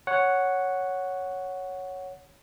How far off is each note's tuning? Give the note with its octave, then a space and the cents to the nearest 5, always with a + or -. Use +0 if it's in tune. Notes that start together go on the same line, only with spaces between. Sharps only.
C#5 +0 F#5 +0